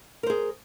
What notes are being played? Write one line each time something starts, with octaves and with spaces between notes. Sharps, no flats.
G#4 A#4 C5